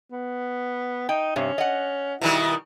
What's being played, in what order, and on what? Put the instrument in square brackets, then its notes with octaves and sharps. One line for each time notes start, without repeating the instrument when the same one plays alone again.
[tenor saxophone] B3
[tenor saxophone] D#4 [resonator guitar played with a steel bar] G5
[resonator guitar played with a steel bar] G2 C3 [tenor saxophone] C#4
[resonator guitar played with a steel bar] D#5 F#5
[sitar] B2 D#3 G3 [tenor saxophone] E4